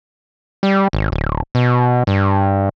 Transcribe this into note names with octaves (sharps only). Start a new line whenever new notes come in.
G3
G#1
D1
B2
G2